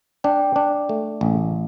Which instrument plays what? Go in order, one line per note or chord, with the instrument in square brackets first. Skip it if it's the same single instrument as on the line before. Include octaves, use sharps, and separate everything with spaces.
[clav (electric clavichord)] D4 [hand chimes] G5
[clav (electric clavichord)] D4
A3
A1